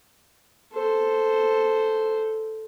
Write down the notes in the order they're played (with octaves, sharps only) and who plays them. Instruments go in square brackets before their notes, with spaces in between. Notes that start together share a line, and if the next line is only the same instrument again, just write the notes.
[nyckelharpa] A4 C5